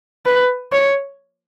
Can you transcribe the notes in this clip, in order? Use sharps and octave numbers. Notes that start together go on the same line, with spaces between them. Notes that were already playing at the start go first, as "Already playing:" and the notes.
B4
C#5